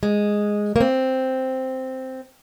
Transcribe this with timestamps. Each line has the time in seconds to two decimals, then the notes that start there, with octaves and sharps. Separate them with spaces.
0.03 G#3
0.76 A#3
0.80 C4